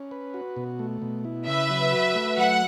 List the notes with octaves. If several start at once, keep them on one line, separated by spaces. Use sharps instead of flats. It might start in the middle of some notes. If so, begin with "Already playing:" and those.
Already playing: C#4
B4
F#4
B2
A3
B2
E4
C#3 B4 E5
F#3
F#4
A3
F#3 F#5